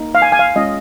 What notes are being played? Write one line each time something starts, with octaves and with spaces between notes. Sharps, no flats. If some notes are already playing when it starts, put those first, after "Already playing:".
Already playing: A#3 D#4
F5
G#5
G#5
F5
G#3 C#4 F4 D#5